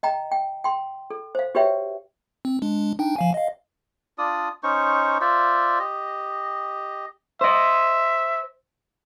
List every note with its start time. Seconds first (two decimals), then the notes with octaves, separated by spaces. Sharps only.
0.03 D#5 G5 A#5
0.32 G5
0.64 G5 C6
1.11 A4
1.35 C5 F5
1.55 F#4 G4 B4 C#5 E5 G5
2.45 C4
2.62 G#3 D4
2.99 D4 D#4 G5
3.16 F3 F5 G#5
3.34 D#5 F5
4.18 D4 F4 D5 D#6
4.63 C#4 D#4 C5 C#6
5.21 F4 C5 D5 E5
5.79 G4 D#5
7.41 C5 D#5 E5